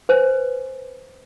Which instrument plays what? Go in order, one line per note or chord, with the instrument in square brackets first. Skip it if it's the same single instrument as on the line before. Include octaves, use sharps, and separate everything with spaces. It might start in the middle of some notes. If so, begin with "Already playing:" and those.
[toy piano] B4 C5 G#5